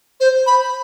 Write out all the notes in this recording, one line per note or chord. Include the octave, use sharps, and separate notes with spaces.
C5
B5